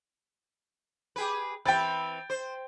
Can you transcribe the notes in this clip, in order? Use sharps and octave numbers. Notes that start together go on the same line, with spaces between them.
G4 G#4 B4
E3 C4 B4 G5 A6
C5